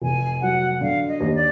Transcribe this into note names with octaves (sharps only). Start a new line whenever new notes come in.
F1 G#5
F#3 F#5
D3 F5
D#5
D#2
D5